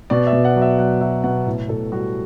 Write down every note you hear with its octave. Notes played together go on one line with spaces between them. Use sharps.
B2 D5
E5
B2
F#5
F#3
E5
F#3 F#5
F#3 E5
B2 F#5
A2
A2 A4
G3 F#4